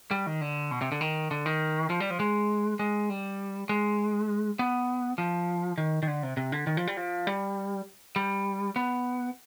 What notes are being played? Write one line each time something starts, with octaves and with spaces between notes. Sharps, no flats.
G3
D#3
D3
B2
C3
D3
D#3
D3
D#3
F3
G3
F3
G#3
G#3
G3
G#3
B3
F3
D#3
D#3
D3
C3
C3
D3
D#3
F3
G3
F3
G3
G3
B3